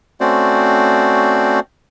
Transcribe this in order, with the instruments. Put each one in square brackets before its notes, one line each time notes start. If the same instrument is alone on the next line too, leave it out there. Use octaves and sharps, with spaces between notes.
[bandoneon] A3 C4 C#4 F#4 C5 D5